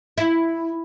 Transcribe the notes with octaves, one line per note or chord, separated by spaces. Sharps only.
E4